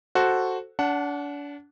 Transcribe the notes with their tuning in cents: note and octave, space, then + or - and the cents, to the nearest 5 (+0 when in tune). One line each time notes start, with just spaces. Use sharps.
F#4 +0 A4 +0 C5 +5
D4 -35 F#5 +0 A5 +0